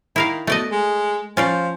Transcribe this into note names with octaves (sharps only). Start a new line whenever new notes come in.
D#3 E4 A#4 F5
B2 A3 D5 D#5
G#3
F3 C#4 F4 D5